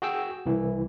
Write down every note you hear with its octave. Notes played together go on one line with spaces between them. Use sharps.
F#4 G#4 G5 E6
C2 E3